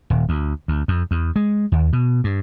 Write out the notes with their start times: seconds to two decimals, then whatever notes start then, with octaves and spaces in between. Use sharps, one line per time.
0.10 D#1
0.29 D2
0.68 D2
0.88 F2
1.11 E2
1.36 G#3
1.72 D#2
1.93 B2
2.24 G2